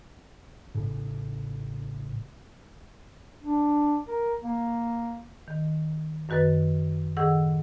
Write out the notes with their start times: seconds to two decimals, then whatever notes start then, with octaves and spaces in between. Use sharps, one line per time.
0.75 A1 A2 C#3
3.42 D4
4.07 A#4
4.42 A#3
5.48 D#3
6.29 F#2 D#3 F#4 B4 A6
7.17 A2 D#3 G#4 F#5 E6